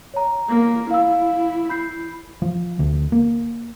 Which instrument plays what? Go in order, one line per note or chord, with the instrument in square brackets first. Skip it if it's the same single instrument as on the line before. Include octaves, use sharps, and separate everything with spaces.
[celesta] C#5 A#5
[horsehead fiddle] A#3
[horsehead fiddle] E4 [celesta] F5 E6
[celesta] B5 G6 C7
[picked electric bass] F3
D2
A#3